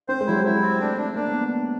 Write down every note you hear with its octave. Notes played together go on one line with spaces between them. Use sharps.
C4 C5
G#3
F#3 E4
G3
G#3 E4
C4
A3 D4
D4
A#3 D4
B3